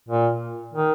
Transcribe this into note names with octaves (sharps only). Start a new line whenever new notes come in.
A#2
D#3